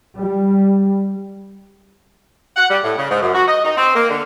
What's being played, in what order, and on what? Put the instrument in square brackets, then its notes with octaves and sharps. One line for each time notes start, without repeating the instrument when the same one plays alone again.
[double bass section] G3
[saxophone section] F#5
G3
A2
C#3
G#2
F#2
F#4
D#5
D#4
C4
A#3
D3